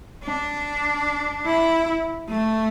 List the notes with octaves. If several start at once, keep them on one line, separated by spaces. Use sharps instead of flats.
D4
E4
A3